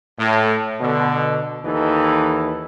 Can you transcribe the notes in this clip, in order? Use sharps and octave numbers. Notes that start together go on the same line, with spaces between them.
A2
B2 D3
D#2 E3 D#4 A4